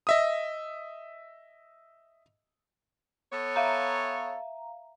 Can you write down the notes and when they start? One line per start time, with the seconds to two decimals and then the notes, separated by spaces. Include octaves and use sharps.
0.07 D#5 E5 D#6
3.32 B3 A4 C#5
3.56 E5 F5 A#5